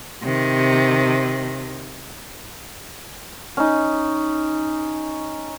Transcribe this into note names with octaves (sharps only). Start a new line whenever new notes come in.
C3 D#3
C#4 D#4